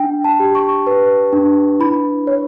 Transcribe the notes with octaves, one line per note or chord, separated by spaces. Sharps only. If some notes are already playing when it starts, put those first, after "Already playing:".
Already playing: D4 G5
A5
G4
C#6
B4
D4
E4 B5
C#5